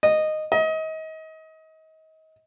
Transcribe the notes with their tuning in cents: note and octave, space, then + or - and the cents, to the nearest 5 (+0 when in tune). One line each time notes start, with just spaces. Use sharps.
D#5 -10
D#5 +30